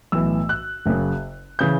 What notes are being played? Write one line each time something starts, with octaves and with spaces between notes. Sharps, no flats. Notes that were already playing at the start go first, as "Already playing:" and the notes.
B1 A2 E3 E6
F#6
F#1 F#2 C#3
C#3 E3 G6